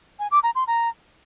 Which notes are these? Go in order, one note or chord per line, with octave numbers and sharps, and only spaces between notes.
G#5
D6
A#5
C6
A#5